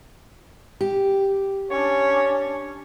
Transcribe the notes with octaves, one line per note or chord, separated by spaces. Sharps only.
G4
C#4 D4 C#5